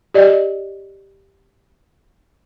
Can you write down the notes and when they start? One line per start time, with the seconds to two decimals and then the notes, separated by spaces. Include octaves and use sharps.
0.14 G4 D5 D#5